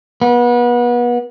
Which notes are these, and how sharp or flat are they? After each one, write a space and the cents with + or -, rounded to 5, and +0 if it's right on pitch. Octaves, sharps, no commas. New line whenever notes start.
B3 -30